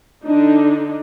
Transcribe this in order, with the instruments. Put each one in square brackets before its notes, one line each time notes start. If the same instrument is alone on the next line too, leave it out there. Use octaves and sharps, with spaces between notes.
[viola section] D3 D4 D#4